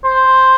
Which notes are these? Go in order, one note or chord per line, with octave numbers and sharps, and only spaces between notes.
C5